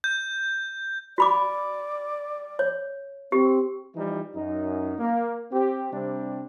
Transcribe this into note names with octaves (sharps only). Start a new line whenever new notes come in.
G6
F#4 D5 B5 D6
C#5
C4 G4
E3 F3 G3 D#4
F#2 D#4
A#3
C4 G4
C3 G3 C4 D4